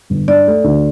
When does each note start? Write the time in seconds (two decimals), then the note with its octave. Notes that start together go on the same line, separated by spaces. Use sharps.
0.10 G1
0.28 G2 D5
0.47 A3
0.64 D2